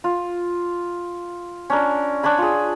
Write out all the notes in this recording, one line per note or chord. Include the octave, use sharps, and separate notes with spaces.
F4
C#4 D4 A#4
D4 C#5 G#5 B5
F4 G#4